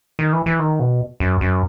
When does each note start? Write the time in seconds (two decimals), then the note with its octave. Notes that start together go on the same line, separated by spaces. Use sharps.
0.19 D#3
0.33 E3
0.46 E3
0.59 D#3
0.80 B2
1.20 F#2
1.41 F#2